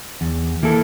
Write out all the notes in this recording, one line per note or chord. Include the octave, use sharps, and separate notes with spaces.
E2
E3 A#3 E4 A4